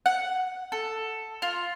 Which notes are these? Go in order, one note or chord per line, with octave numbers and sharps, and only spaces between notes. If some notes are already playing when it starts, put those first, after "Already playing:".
F#5
A4
F4